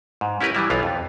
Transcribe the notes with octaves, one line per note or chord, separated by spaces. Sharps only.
G#2
C#4 E4 G4 A#4 B4
E3 F#3 G3 E4
B1 E3 B3 F4 F5
F2